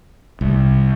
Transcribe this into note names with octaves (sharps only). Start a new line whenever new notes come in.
C2